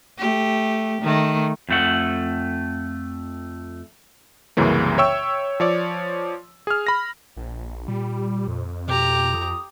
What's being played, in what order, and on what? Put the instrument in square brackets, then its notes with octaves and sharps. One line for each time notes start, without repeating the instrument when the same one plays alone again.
[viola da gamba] A3 G4
D#3 A3
[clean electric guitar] F2 A3 F#5
[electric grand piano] C2 F#2 C#3 E3 A#3
C#5 E5 G5 C#6 E6
F3 C#5 D5
G#4 F6
B5 A#6
[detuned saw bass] A#1
[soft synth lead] A#2 [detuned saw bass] G3
[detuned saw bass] F2
[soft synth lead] B2 [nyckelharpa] G4 A#5
[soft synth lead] D#6